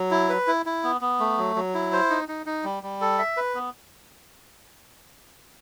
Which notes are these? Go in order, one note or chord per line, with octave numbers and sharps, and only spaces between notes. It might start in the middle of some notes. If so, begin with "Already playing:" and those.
Already playing: F#3
E4
B4
E4
E4
B3
B3
A3
F#3
F#3
E4
C5
D#4
D#4
D#4
G3
G3
A4
E5
B4
B3